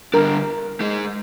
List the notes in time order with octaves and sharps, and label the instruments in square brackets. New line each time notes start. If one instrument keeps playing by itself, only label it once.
[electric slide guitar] D3 G3 D4 [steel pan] A#4
[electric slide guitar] G#3 D#4 G#4